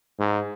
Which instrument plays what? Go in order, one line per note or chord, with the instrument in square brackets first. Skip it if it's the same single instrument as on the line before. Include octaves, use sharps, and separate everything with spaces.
[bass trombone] G#2